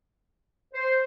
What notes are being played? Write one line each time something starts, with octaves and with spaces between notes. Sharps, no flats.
C5